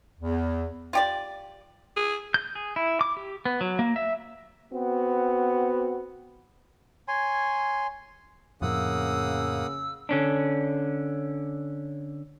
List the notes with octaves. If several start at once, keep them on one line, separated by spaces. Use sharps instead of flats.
E2
F4 G4 D5
G#4
G6
G#4
E4
D6
G4
B3
F#3
A#3
E5
B3 C4 F#4
C#5 G#5 C6
F2 A2 C#3 F3 A#3 F#5 D#6 E6
D3 C#4 D4